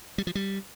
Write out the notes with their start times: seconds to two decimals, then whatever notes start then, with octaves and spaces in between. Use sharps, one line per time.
0.18 G3
0.27 F3
0.35 G3